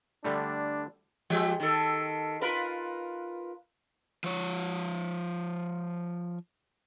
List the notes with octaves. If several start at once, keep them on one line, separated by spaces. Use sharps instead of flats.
D3 G3 A3 D4
F3 G#3 G4
D#3 A4
F4 A#4 B4
F3 C#5